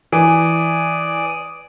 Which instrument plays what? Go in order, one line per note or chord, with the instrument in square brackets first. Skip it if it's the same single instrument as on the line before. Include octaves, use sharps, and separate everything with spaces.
[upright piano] E3 [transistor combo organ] D5 D#6